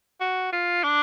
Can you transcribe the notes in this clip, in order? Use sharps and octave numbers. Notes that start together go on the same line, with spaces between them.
F#4
F4
D4